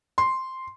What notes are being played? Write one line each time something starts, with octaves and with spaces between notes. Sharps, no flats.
C6